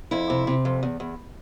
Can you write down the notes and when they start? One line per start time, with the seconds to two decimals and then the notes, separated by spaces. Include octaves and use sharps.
0.11 F2 E4
0.30 C3
0.47 C3
0.65 F2
0.83 E2
1.00 E2